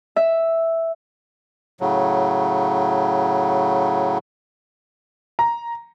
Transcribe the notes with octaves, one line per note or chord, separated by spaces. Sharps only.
E5
A2 C#3 F#3
A#5